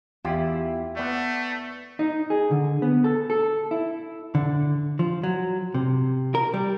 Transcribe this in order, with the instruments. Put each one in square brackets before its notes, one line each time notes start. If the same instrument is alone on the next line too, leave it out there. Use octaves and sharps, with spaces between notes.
[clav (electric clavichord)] E2 F4 G4 [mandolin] E4
[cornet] A3 [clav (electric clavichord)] B3 D5
[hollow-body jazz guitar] D#4
G#4
D3
B3
A4
A4
E4
D3
F3
F#3
C3
A#4
G3